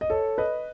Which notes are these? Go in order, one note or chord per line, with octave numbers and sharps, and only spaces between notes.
D#5
A4 C#5
B4 D#5